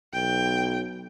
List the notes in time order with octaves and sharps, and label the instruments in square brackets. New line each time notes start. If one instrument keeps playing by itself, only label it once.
[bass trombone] B1 [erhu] G5